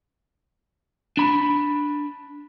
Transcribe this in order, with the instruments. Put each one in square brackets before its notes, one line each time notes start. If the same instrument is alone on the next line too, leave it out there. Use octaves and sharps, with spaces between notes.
[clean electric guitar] D4 B5